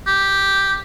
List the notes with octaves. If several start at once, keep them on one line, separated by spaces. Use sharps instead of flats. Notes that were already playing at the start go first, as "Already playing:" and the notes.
G4